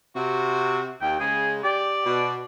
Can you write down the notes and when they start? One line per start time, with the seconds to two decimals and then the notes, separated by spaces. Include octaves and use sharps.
0.16 C3 F#4
1.01 D#2 G5
1.20 C#3 G#3 G#4
1.64 G4 D5
2.05 B2